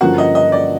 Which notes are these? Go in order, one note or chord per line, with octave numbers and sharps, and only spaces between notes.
G2 D3 F3 A#3 C#4 F#4 F#5
D#5
D#5
D5